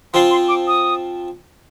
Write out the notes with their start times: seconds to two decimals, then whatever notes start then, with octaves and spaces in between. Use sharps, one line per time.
0.14 F3 C4 F4 C6
0.31 C6
0.48 D6
0.67 D#6